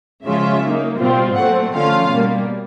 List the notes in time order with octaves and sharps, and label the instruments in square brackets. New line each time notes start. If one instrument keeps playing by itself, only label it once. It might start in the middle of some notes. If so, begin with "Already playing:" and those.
[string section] C#3 F3 G#3 C#4 F4 E5
F#3 A#3 D#4
B2 G3 C4 F4
A#2 F#3 A3 C4 F#5
D3 F3 A3 C#4 F4 F5
B2 G3 A#3